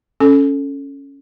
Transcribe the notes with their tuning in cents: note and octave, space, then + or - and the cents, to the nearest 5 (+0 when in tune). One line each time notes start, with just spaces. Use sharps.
C#4 +0 A4 +0